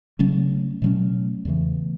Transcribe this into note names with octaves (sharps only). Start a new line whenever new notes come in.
C#3 F#3 A3 C#4
B2 F#3 A3 C#4
E2 C#3 E3 A3